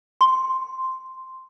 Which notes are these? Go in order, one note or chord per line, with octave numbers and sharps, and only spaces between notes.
C6